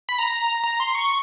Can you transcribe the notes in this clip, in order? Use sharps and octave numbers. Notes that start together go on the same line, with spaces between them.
B5
A#5
A#5
C6
C#6